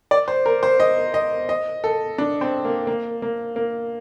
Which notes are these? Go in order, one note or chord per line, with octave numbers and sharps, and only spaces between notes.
D5
C5
A#4
C5
D#5
D#5
D#5
A4
D4
C4
A#3
A#3
A#3
A#3